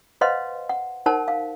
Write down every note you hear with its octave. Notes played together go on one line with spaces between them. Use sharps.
B4 C5 D#5 F5 F#5 C6
F#5
D#4 A#4 C5 F#5 A5
F5